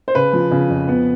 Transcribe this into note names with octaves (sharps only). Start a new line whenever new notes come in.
C5
C#3 B4
F3
C#3
F2
B3